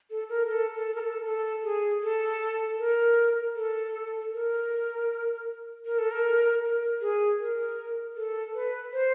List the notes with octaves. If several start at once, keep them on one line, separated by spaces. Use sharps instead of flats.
A4
A#4
A4
A4
A#4
A4
A4
G#4
A4
A#4
A4
A#4
A#4
A4
A#4
A#4
G#4
A#4
A4
B4
C5